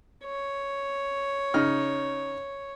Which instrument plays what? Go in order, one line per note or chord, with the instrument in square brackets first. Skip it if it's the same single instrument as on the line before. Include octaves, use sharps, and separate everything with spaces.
[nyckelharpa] C#5
[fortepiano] C#3 D#4 F6